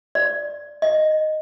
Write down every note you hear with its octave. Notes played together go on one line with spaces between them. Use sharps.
D5
D#5